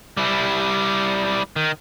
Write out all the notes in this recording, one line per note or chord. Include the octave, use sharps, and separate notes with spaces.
G3 E4
D#3